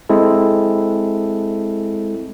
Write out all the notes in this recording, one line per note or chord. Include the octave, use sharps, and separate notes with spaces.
G#3 C4 E4 A4